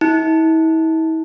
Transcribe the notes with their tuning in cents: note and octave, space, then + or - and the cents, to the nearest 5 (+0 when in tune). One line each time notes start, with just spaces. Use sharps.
E4 -40